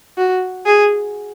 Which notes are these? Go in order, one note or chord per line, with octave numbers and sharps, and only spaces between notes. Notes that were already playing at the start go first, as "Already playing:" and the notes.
F#4
G#4